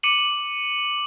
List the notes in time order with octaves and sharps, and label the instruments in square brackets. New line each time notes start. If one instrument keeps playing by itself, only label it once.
[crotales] D6 C#7 D#7 F#7